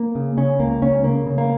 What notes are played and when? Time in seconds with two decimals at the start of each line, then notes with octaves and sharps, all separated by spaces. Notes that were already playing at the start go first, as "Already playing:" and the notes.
Already playing: A#3
0.15 C#3
0.37 C#3 C#4
0.59 C#2 A#3
0.82 C#2 C#4
1.04 C#3 A#3
1.27 C#3
1.38 A#3